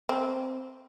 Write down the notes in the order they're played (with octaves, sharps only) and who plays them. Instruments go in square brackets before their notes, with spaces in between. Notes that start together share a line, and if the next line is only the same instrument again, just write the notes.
[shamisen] C4